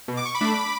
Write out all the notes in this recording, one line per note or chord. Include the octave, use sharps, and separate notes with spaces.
B2
D6
C#6
B5 D6
A3 D4